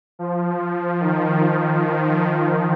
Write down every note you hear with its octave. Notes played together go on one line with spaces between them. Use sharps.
F3
D#3